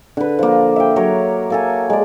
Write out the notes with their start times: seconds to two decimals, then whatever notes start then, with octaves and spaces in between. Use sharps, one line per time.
0.17 D3 B4
0.39 F3 A#3
0.76 E5 G5
0.96 F#3 A#4 C#5
1.50 A#3 A4 G#5
1.90 G#3 D5